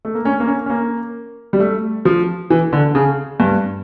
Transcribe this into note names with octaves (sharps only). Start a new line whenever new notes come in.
A3
A#3
C#4
A#3
C#4
C#4
A#3
G3
A3
F3
E3
D3
C#3
G2